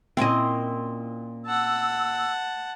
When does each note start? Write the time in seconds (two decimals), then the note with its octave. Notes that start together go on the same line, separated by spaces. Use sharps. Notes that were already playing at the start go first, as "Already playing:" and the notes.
0.17 A#2 C4 C#4 E4 D#5
1.46 F#5 A5 E6